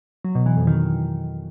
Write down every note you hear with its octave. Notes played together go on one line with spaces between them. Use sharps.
F#3
B2
E3
F2
D#3